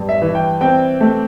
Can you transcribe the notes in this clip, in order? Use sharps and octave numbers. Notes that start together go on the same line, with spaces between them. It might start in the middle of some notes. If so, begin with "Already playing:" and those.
Already playing: G2
E5
E3
G5
C4 G5
A3